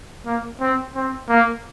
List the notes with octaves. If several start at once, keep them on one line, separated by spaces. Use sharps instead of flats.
A#3
C4
C4
A#3